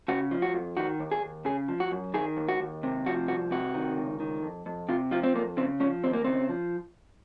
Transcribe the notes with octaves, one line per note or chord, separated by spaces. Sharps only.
C#3 F#4
F3
F#4
F2
D#3 F#4
D#2
G#4
D#2
C#3 G#4
F3
F#4
F#2
D#3 G#4
D#2
F#4
D#2
C3
F3 F#4
C2 F#4
C3 F#4
D#3
C#2
D#3
F2
F2
C3 F4
F3 F4
C4
F2 A#3
C#3 C4
F3 C#4
D#2 C4
A#3
C#3 C4
F3